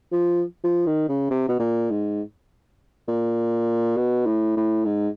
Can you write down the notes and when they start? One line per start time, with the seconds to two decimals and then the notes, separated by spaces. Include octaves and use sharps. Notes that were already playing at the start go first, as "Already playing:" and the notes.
0.12 F3
0.64 F3
0.86 D#3
1.09 C#3
1.30 C3
1.49 B2
1.59 A#2
1.90 G#2
3.08 A#2
3.97 B2
4.26 A2
4.57 A2
4.85 G#2